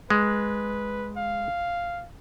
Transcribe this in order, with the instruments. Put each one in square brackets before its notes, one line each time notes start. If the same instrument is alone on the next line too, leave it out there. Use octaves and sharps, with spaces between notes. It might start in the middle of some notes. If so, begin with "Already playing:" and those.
[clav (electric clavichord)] G#3 [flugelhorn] B4
[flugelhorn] F5